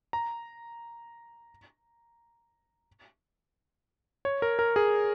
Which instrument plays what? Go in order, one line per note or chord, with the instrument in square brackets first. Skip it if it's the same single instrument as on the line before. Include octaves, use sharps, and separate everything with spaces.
[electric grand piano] A#5
C#5
A#4
A#4
G#4